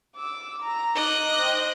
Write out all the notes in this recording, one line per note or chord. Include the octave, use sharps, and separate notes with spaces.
D6 E6
A#5
D#4 D#5 D6 F#6
C5 G5